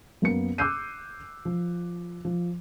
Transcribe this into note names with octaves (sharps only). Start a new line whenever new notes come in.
F#2 A#3 B3 C#7
D6 E6 F#6 G6 C7 D#7
F3
F3